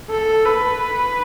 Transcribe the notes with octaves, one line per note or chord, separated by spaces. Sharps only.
A4
B4